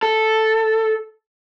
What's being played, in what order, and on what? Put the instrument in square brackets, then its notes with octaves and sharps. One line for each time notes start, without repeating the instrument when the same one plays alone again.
[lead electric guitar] A4